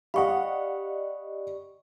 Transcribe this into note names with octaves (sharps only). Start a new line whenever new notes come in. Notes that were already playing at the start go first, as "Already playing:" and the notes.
G4 D5 D#5 F5 F#5 B5 C#6